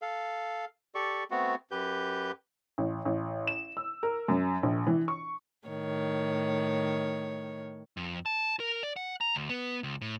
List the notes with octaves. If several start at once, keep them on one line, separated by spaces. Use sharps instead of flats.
A4 F5
G4 A4 D5 C#6
A3 B3 C4 F#4
F#2 G4 B4 G6
A1
A1
E7
E6
A#4
F#2
A#1
E3
C#6
A2 D#3 C#5
F2
A5
A#4
D5
F#5
A#5
D2
B3
C#2
A2